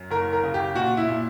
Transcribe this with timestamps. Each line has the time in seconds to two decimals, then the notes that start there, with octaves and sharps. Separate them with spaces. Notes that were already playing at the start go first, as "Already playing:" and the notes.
Already playing: F#2
0.11 F#1 A#4
0.33 A#4
0.43 C#3
0.54 G4
0.75 A#2 F#4
0.97 E4
1.08 A#2